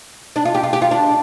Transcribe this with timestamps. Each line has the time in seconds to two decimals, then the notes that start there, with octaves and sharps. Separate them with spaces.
0.36 D4
0.45 F4
0.55 G4
0.63 F4
0.73 G4
0.82 F4
0.91 D4